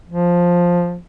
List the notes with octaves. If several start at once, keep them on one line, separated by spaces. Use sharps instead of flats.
F3